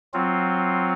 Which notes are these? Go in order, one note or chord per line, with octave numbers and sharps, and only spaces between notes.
F#3 C4 F4